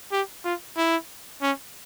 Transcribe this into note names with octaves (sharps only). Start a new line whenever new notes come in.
G4
F4
E4
C#4